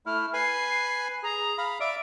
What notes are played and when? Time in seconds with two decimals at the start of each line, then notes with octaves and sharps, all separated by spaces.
0.06 A3 E4 F6
0.33 B4 G#5 C7
1.23 G#4 A#5
1.58 F5 B5
1.80 D5 E5 D7